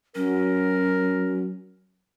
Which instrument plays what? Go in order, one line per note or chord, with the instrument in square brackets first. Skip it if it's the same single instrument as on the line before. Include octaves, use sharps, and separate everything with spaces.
[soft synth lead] F#3 [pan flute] C#4 [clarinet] A#4